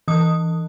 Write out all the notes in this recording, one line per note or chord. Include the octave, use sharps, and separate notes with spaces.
E3 D#6